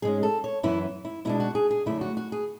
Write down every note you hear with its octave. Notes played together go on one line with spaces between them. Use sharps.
G#2 G#3 C#4 G#4
A4
C#5
F#2 E3 B3 E4
E4
B2 G#3 D4 E4
F#4
G#4
G#4
F#2 D3 A3 E4
F#4
F#4
G#4